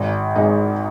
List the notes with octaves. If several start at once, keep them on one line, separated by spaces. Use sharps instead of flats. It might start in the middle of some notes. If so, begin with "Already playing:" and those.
Already playing: G#1
G#2 G#3 D#4